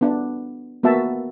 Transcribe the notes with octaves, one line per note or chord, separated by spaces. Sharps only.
B3 D4
A#3 B3 F#4 E5 A5